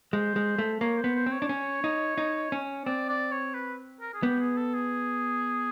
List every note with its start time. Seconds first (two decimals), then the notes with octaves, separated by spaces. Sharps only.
0.13 G#3 C5
0.36 G#3
0.58 A3
0.81 A#3 C#5
0.98 C5
1.04 B3
1.16 C5
1.26 C4
1.32 C#5
1.42 D4
1.49 C#4
1.84 D#4
2.18 D#4
2.52 C#4
2.86 C4 D5
3.09 D5
3.32 C#5
3.54 B4
4.01 A#4
4.14 G#4
4.23 B3 G4
4.40 G#4
4.57 A4
4.74 G#4